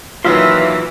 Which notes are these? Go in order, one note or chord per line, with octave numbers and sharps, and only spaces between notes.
A#2 D#3 E3 F#3 F4 E5 F5 C6